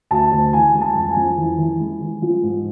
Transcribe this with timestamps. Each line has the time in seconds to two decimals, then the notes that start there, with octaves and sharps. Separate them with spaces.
0.11 D2 A5
0.32 D2
0.53 E3 G#5
0.74 G#3
0.81 A5
0.95 F2
1.09 G#5
1.16 F2
1.38 E3
1.58 E3
1.80 G#3
2.01 E3
2.22 F3
2.43 G#2